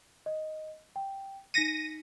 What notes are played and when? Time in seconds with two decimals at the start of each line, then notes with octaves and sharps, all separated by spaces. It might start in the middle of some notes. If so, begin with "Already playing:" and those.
0.26 D#5
0.96 G5
1.54 D#4 A#6 B6 C#7 D#7